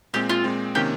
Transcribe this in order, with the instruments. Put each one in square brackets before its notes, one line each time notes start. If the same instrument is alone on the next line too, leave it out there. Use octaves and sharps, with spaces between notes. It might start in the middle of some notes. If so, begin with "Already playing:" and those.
[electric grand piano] A#2 G#3 C4 [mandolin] G4
[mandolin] F4
[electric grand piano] A#2 G#3 C4
[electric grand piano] C3 D#3 A#3 C#4 [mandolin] G4